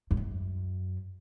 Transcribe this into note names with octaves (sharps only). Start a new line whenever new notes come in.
F2
F#2